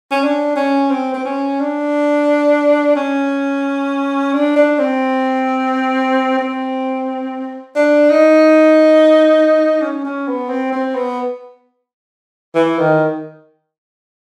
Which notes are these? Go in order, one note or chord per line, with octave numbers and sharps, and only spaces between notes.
C#4
D4
C#4
C4
C4
C#4
D4
C#4
D4
D4
C4
C4
D4
D#4
C#4
C#4
B3
C4
C4
B3
E3
D#3